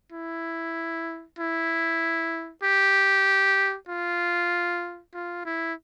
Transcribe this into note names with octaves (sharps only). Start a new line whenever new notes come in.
E4
E4
G4
F4
F4
E4